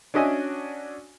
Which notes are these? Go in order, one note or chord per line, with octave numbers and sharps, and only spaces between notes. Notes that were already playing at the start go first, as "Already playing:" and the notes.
C#4 D4 F#4 D#5 E5 G#5